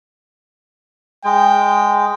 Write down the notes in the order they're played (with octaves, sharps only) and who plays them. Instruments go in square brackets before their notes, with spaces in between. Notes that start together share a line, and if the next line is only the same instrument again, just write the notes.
[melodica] G#3 [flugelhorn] G5